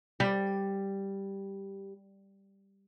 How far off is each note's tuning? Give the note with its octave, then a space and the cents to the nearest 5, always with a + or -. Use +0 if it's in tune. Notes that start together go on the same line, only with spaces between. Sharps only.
G3 +0